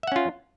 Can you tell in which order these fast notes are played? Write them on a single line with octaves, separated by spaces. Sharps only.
E5 F#5 C#4 F4